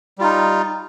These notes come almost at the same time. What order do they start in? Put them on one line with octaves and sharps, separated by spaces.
G3 F4 D#4